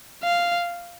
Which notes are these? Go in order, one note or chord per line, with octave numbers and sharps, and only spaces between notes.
F5